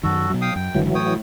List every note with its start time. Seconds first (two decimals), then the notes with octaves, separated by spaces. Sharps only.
0.04 F#2 D#3 F#4 A4
0.30 B2 F#3
0.41 F5 G5 D#6
0.56 F#2 G5
0.75 F#1 D3 E3 F#3 G#3
0.95 A2 C#5 G5 D#6